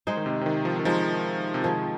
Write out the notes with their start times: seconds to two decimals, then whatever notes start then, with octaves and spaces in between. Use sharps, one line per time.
0.07 G#3 D#4 G#4 C5
0.17 D#3
0.26 C3
0.41 C3
0.46 D#3
0.65 F3
0.79 D#3
0.85 F3 G#3 D#4 G#4 C5
1.54 C3
1.64 D#3 F3 G#3 D#4 G#4